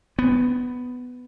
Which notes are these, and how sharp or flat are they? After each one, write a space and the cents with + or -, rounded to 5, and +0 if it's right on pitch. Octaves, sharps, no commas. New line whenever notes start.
B3 +10